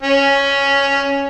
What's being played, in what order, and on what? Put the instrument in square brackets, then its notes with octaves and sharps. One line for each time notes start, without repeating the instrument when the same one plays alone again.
[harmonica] C#4